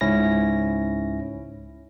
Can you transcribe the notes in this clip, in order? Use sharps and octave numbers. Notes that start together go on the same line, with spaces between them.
C#2 G#2 C#4 E4 A#6